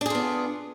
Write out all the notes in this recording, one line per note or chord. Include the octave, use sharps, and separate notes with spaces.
B3 D4 F4 G#4